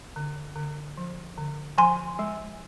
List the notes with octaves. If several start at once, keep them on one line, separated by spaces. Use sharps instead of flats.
D3
D3
F3
D3
F3 G#5 C6
G#3